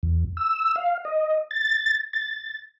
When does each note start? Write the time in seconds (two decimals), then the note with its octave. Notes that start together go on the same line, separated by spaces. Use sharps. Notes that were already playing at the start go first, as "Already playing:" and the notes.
0.03 E2
0.37 E6
0.76 F5
1.05 D#5
1.51 A6
2.13 A6